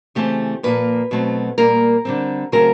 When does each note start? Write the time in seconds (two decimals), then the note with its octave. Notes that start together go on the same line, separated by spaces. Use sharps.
0.15 C#3 E3 A3 C4 G4
0.63 A#2 F3 A#3 B4
1.11 B2 F#3 A3 C4
1.58 A#2 G3 A#3 A#4
2.05 D3 G3 C4
2.52 C#3 F#3 A3 C4 A#4